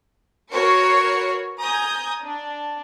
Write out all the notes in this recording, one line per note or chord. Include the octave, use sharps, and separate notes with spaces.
F#4 A#4 B4 C#5 C7 C#7
G#5 A#5 D#6 G6 G#6
D4